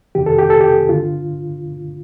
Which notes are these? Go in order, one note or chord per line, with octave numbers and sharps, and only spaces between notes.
F2 C3 D#3 G4
A4
G4
A4
G4
G2 D3 F4